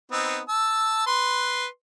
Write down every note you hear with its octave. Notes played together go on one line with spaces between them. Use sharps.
B3 C4 D#4
A5 E6
B4 C6